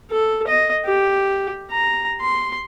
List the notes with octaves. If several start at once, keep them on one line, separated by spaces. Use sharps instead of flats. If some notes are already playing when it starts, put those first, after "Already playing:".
A4
D#5
G4
A#5
C6